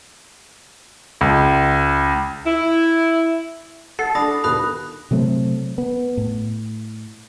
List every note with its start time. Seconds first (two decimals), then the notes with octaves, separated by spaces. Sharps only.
1.21 C#2
2.46 E4
3.99 A4 F#5 C7
4.15 D4 B5 D#6 A#6
4.44 D#2 B2 B5 D#6 F#6
5.11 C3 F#3 A3 C4
5.78 B3
6.17 A2